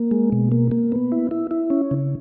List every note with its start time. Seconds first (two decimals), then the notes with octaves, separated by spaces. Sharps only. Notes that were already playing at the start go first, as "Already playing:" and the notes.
Already playing: A#3
0.11 G#3
0.32 B2
0.52 A#3
0.71 A#3
0.92 B3
1.12 E4
1.31 E4
1.51 E4
1.70 C#4
1.91 C#3